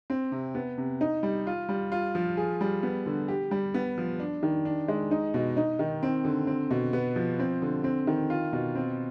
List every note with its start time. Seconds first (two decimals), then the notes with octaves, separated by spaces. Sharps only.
0.10 C4
0.32 C3
0.55 B3
0.78 C3
1.01 D#4
1.23 G3
1.47 F4
1.69 G3
1.92 F4
2.15 F3
2.37 G#4
2.61 G3
2.83 B3
3.06 D3
3.28 G4
3.51 G3
3.74 B3
3.98 F3
4.20 D4
4.43 D#3
4.65 D4
4.88 G#3
5.11 D#4
5.34 B2
5.57 D#4
5.79 D#3
6.03 C4
6.25 D3
6.47 C4
6.71 B2
6.93 B3
7.16 F3
7.39 C4
7.62 D3
7.84 C4
8.07 D#3
8.30 F4
8.53 B2
8.75 C4